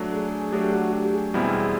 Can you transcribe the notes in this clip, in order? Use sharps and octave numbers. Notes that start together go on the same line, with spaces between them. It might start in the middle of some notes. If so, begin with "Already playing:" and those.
Already playing: F#3 A3 D4
G#4
G#4
F#3 A3 D4 G4
F#4
G4
G#4
E2 B2 G3 C4 E4 G#4